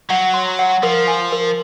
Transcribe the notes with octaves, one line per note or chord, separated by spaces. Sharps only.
F#3 F#5
C6
F#5
F3 A#4
G#5
A#4